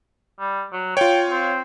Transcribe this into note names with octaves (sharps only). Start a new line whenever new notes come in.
G3
F#3
F4 C#5 G5
C4